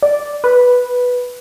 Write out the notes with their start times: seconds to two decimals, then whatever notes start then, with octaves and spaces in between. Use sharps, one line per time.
0.02 D5
0.44 B4